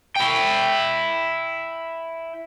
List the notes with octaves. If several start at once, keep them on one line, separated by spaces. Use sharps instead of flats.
E4 G5